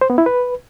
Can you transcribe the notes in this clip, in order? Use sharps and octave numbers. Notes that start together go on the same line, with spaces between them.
C5
B3
E4
B4